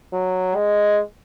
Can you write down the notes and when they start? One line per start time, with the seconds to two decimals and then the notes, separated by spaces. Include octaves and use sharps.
0.13 F#3
0.55 G#3